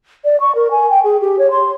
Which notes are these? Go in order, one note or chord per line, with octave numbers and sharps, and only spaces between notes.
D5
C#6
A#4
G#5
G5
G#4
G4
C#5
C6